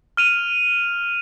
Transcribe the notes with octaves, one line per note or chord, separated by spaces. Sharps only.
F6 D#7 F7